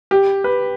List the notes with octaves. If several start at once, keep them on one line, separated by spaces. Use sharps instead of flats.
G4
B4